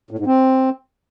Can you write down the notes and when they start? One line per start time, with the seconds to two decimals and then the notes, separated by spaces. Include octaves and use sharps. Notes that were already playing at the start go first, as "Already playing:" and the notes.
0.11 A2
0.19 G#2
0.27 C4